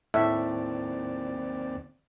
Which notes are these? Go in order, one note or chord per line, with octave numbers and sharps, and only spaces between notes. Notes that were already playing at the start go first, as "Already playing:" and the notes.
D#2 A2 C4 D5 E5